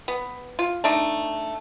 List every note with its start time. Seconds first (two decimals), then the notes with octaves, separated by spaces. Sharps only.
0.08 B3
0.59 F4
0.84 A3 D4 D#4